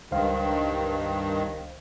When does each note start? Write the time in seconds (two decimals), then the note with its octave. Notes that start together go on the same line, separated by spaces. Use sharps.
0.12 C#2 G2 D#3 C5 F5